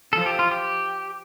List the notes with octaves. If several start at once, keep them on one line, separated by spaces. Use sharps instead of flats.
F3 A4
G4
F4
G4